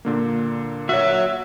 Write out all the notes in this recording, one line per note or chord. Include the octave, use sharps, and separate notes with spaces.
A#2 D3 A#3
F#4 C#5 E5